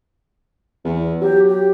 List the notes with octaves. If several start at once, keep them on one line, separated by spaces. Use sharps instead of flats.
E2
F#3 G4
G4